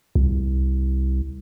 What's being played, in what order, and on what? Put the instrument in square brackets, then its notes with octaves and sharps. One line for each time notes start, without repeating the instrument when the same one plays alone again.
[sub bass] C2